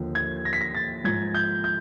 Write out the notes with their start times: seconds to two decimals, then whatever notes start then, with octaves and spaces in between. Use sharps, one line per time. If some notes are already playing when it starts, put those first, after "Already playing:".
Already playing: D#2 D3 F3
0.15 G#6
0.45 A#6
0.53 B6
0.61 A#6
0.75 A6
1.04 G#2 F3 G#6
1.35 G6
1.64 G6